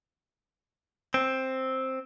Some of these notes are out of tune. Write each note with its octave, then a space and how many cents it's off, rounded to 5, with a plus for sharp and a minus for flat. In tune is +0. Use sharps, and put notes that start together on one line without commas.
C4 +5